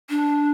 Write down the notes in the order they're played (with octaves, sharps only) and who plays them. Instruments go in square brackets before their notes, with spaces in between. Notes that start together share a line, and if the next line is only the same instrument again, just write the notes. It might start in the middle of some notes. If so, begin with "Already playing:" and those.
[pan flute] D4